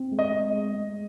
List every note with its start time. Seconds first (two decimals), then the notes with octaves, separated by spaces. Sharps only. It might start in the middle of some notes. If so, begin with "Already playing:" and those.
Already playing: C4
0.11 G#3
0.19 D#5
0.32 G#3
0.53 G#3
0.74 G#3